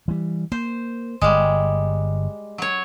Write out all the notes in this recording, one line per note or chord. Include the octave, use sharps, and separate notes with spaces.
E3 G3
A#3 C5
G1 G3 G#3
F#3 C#5